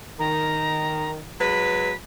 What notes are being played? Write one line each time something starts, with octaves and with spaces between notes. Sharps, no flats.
D#3 A#5
F#3 G#3 B4 B6